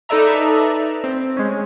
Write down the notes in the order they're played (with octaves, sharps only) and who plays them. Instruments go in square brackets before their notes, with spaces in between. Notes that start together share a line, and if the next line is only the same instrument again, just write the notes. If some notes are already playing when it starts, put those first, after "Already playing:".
[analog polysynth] D#4 A4 B4 D5 E5 A#5
C4
G#3 C#4